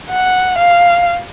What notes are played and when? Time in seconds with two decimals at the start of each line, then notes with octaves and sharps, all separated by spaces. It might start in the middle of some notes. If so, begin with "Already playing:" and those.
0.11 F#5
0.58 F5